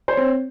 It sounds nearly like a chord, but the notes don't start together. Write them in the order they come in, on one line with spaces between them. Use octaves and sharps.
C5 C#5 C4